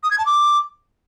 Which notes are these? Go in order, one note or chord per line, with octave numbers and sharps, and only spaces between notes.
D#6
G#6
A5
D6